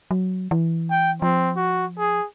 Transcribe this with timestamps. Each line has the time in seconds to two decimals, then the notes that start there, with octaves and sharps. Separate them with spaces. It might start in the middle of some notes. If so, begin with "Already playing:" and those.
0.11 F#3
0.51 E3
0.91 G5
1.22 F3 C4
1.56 F#4
1.98 G#4